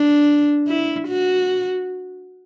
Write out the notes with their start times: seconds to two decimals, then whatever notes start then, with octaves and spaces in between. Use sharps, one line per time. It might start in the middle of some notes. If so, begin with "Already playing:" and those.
Already playing: D4
0.67 E4
1.08 F#4